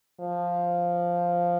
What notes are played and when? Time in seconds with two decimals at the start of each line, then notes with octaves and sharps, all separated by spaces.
0.20 F3